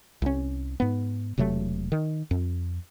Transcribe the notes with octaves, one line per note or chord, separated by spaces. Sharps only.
C2 C#4
G#2 B3
E1 C3 F#3 A3
D#3
F2